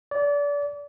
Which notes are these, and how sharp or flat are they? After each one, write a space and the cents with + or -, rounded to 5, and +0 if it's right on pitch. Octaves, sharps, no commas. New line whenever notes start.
D5 -30